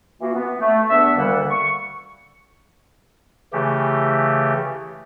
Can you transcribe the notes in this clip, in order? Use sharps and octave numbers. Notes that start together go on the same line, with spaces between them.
E3 A#3 F4 F#4
B3
A3
E2 B3 D4 E5
D2 D3 D#3 G3 A#3 F#5
C#6
C#3 E3 A3 G4